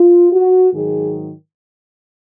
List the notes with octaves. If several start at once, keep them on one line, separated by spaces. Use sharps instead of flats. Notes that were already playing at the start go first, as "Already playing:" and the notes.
Already playing: F4
F#4
G#2 D#3 F#3 G#4